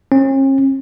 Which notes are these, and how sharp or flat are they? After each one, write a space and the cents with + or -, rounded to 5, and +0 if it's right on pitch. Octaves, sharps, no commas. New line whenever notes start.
C#4 -45